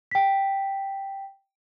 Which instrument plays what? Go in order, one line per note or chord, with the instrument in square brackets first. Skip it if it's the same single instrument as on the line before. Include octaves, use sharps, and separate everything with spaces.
[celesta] G5 B6